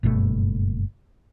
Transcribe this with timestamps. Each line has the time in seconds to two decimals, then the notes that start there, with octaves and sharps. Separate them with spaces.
0.03 F#1 G2 B2 A3